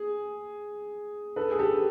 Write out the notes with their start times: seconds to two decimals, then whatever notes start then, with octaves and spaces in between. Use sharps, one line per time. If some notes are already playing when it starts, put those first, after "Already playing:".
Already playing: G#4
1.36 A4 B4
1.52 G#4
1.59 G4 A4